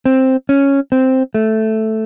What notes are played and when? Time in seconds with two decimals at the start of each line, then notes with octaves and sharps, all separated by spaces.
0.06 C4
0.49 C#4
0.92 C4
1.34 A3